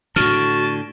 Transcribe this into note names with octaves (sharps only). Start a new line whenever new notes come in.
A2 D3 F#4 A5 F6